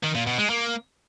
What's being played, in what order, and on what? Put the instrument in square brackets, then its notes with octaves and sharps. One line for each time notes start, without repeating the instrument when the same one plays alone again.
[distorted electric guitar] D#3
A#2
B2
G#3
A#3